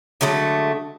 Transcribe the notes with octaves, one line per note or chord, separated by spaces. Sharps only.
D3 F#3 G#3 A3